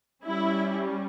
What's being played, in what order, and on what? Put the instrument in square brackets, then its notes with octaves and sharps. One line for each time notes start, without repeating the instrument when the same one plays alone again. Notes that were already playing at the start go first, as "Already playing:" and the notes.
[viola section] G3 C#4 E4